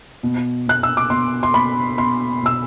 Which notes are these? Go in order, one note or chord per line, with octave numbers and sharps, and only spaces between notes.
B2
B2 F#6
E6
D6
B2 C6
C6
B2 B5
B2 C6
B2 E6